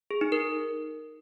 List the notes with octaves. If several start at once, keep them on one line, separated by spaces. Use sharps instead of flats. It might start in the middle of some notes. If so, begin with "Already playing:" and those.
G#4
D#4
A#4